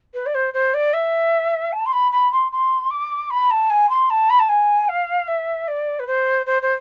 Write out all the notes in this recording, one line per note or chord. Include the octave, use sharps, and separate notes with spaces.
B4
D5
C5
C5
D5
E5
A5
C6
B5
B5
C6
C6
D6
B5
A5
G#5
C6
A5
B5
A5
G#5
F5
E5
D5
B4
C5
C5
C5